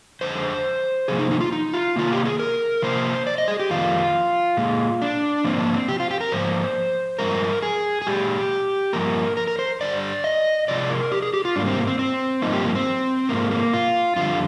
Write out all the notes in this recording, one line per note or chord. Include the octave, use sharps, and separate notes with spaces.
F2 D3 G#3 C5
C3 F3 A#3 G#4
D#4
D#4
F4
D#4
F4
C3 D#3 A#3 F4
G4
G#4
A#4
C3 F3 A#3 C5
D5
D#5
G#4
G4
F2 D#3 G3 A#3 F4
A#2 G#3
D4
G#2 F3 A#3 C4
D4
C4
G4
F4
G4
A#4
G#2 F3 A#3 C5
G2 F3 G#3 A#4
G#4
G#4
A#2 G#3 G4
G2 F3 A#3 A#4
A#4
A#4
C5
G2 D3 G3 D5
D#5
C3 F3 G#3 D5
A#4
G4
G#4
G4
F4
G#2 G3 A#3 D4
C4
A#3
C4
C4
G2 F3 A#3 D#4
G4
A#3
C4
G#2 F3 G#3 A#3
A#3
F4
F2 D3 G3 F4